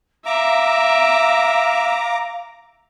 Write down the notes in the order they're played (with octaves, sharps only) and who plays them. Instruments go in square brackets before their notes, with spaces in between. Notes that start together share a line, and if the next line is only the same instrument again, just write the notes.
[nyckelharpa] E5 [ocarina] F5 [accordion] A#5 D6